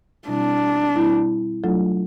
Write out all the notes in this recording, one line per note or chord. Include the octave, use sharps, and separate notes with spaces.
B2 G3 C4 D4 E4
B2 G3 C4 E4
F#3 A3 D4 F4 A4